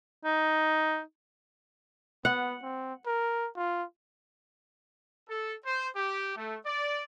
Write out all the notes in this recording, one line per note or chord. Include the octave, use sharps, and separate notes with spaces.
D#4
B3 F#5
C4
A#4
F4
A4
C5
G4
A3
D5